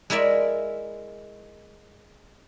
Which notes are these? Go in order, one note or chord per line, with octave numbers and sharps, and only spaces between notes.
G#3 E4 A#4 D5 E5